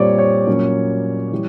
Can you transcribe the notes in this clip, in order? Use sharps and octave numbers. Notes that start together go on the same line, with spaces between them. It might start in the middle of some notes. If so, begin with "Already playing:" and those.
Already playing: A#2 G3 C4 C#5 D5
C#5
A#2 F#3 A#3 C#4
E3 G3